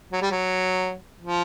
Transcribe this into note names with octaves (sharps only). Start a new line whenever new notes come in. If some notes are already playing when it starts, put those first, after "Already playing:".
F#3
G3
F#3
F3